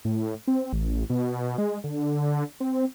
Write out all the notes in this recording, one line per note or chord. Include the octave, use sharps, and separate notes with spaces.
A2
C4
A1
B2
G#3
D3
C4